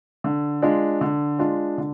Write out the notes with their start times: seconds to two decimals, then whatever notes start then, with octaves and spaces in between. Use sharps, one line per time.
0.24 D3
0.62 G#3 D4 F4
1.01 D3
1.39 G#3 D4 F4
1.78 D3